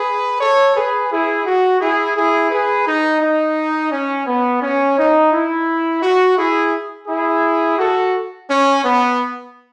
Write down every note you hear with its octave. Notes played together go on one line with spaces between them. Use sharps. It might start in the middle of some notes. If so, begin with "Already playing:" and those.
Already playing: G#4 B4
A4 C#5
G#4 B4
E4 G#4
F#4
E4 G#4
E4 G#4
G#4 B4
D#4
D#4
C#4
B3
C#4
D#4
E4
F#4
E4 G#4
E4 G#4
F#4 A4
C#4
B3